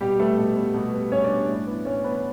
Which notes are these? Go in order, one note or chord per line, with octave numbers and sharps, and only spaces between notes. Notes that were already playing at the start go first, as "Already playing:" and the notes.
B2 G3 G4
G3 A3 B3 A4
B2
G3 B3
B2
G3 B3
B2 C#4 C#5
D4 D5
G3 B3
D4 D5
A2
E3 B3
A2 C#4 C#5
E3 B3 B4